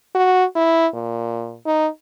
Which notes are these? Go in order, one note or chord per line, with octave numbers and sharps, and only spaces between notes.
F#4
E4
A#2
D#4